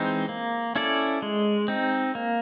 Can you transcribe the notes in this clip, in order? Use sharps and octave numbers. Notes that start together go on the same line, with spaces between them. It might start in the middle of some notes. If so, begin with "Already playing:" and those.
Already playing: E3 G#3 C4 D#4
A#3
C#4 E4 A4 D5
G#3
C4 D#4
A#3